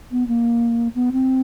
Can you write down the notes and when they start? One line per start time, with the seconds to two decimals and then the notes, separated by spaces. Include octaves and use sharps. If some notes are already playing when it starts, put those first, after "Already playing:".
0.12 B3
0.28 A#3
0.95 B3
1.12 C4